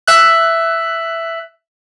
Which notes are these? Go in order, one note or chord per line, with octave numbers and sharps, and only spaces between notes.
E5 F#6